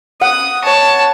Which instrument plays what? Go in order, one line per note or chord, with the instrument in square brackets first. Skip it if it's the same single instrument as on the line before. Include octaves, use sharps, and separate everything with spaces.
[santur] F#5 [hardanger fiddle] D#6
[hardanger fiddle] C#5 A5